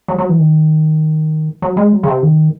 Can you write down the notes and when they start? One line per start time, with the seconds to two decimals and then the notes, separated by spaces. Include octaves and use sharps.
0.08 F#3
0.18 F#3
0.29 E3
0.39 D#3
1.62 F#3
1.77 G#3
1.92 F#3
2.03 C#3
2.08 C3
2.23 D#3